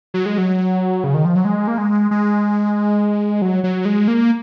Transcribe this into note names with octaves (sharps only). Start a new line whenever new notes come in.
F#3
G#3
F#3
C#3
D#3
F3
F#3
G#3
A#3
G#3
G#3
F#3
F#3
G#3
A#3